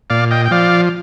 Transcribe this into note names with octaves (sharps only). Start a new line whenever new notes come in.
A#2 D5 F5
D#5 G5
G5
F3 D5 F5